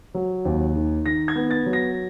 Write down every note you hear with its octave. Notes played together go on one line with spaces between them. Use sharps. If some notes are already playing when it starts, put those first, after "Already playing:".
F#3
D#2
D#3
D#3 A#6
G#6
B3
A6
F#3
A#6